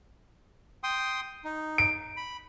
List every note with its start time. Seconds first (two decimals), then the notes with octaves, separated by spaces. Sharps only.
0.83 G5 C6 D#6
1.44 D#4
1.78 D7
2.17 B5